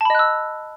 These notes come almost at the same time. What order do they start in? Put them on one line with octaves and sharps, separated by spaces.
A5 B5 D#5 F#6 E6